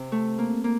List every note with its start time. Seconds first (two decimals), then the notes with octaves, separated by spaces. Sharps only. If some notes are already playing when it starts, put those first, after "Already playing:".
Already playing: C3 C4
0.12 A3
0.38 A#3
0.64 A#3